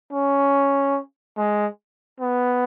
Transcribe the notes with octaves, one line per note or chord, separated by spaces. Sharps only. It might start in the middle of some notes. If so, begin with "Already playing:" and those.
C#4
G#3
B3